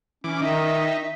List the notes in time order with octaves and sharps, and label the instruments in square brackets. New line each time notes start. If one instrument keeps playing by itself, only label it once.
[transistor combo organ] E3 D6 [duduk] C#4
[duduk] D#3 [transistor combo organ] D#4 [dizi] E5